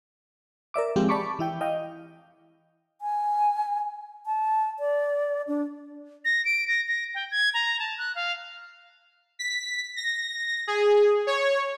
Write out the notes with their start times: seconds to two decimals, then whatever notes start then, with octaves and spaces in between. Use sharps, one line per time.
0.74 A#4 D5 E5 D6
0.96 F3 G#3 C4 F4 G4
1.09 D5 A5 B5 C#6 D6
1.39 E3 E4 G5
1.61 D#5 F5 G5
3.01 G#5
4.26 A5
4.79 D5
5.48 D4
6.25 A#6
6.45 D7
6.68 A#6
6.88 A#6
7.15 G5
7.31 G#6
7.54 A#5
7.79 A5
7.98 F#6
8.15 F5
9.39 B6
9.96 A#6
10.67 G#4
11.27 C#5